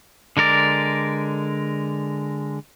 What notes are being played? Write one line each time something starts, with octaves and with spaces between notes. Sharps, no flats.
D3 G#3 A#4 D5